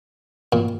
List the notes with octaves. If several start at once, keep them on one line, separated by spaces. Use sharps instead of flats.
A#2